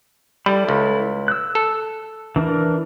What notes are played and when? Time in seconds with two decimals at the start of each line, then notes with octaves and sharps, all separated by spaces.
0.46 G3 E4 A4 B5
0.69 C#2
1.28 E6 F#6
1.55 A4
2.36 E3 D4 A#4